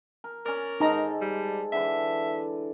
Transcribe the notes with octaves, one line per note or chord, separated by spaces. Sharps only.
A#4
C#4 A#4 D5
G#2 D#4 A4 A#5 C6
G3
D3 E3 B4 E5